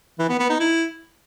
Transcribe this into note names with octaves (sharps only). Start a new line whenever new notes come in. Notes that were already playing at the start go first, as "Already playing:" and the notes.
E3
B3
B3
D#4
E4